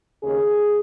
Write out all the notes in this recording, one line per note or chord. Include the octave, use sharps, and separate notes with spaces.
D#2 C#3 G#4